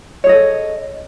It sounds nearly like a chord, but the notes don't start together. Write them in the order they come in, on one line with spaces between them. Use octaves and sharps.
C#5 G#4 D#5 A4